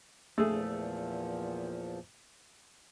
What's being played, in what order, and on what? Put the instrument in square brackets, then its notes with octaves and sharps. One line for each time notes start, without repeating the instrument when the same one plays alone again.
[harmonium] E2 A#2 F3 [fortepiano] A3 G#4